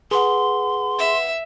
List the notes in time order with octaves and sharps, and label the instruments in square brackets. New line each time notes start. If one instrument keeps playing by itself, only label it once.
[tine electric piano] G#4 [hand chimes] B4 F#5 [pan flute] C6
[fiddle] E5